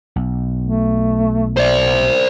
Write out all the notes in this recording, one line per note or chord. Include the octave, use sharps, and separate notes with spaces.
B1
A3
C5 D5